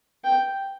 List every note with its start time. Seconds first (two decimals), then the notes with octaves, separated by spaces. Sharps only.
0.24 G5